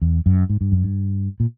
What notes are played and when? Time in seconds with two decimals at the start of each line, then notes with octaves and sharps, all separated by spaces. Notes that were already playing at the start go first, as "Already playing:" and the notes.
0.02 E2
0.26 F#2
0.50 G#2
0.61 G2
0.72 F#2
0.84 G2
1.40 A#2